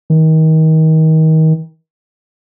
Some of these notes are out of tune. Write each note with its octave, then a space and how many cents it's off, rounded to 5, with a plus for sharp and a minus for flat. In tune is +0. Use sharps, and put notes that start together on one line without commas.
D#3 +30